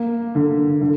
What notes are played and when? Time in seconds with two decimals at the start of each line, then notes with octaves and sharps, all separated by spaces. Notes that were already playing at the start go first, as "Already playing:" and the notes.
Already playing: A#3
0.35 D3
0.82 D3